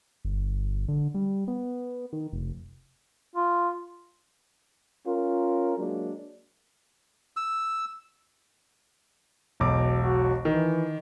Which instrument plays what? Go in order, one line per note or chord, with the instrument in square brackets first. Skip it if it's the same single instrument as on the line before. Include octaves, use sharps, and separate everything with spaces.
[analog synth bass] G1
D3
G3
B3
D#3
F1
[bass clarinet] F4
[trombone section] C#4 F4 A#4
F#3 G#3 A#3 D4
[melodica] E6
[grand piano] E1 B1 D6
[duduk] F#4
[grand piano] D#3 [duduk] E3